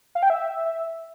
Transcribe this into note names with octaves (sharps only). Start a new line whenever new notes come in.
F5
G5
E5